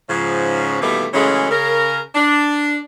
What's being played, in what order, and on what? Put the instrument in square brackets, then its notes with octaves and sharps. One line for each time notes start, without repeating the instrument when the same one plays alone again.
[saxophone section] G#2 C#3 F3
B2 D#3 E3 G3 A3 A#3
C#3 E3 F#3 G#3 A3 C#4
C#3 A#4
D4